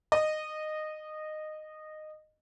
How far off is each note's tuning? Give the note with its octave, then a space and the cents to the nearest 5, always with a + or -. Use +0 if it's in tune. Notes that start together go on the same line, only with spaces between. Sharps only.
D#5 -15